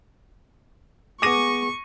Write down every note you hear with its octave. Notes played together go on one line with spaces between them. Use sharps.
B3 G#4 G#5 C#6 D6 A#6 D#7